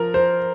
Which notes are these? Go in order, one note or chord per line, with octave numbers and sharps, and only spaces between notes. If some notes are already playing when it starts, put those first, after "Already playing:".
Already playing: F3 A#4
C5